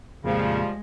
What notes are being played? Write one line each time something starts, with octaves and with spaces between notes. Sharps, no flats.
F2 A#2 C#3 F3 G3 G#3 A#3